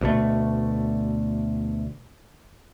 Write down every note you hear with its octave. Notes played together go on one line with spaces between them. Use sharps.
D2 B2 A3